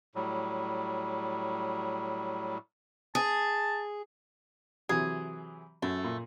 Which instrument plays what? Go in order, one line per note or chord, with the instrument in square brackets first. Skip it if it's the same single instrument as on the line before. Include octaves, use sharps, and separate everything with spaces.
[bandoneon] A2 F#3 G3
[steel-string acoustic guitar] G#4 [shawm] A5
[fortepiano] C3 E3 F#3 [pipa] G#4
[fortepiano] F#2 [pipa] A3
[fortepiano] A#2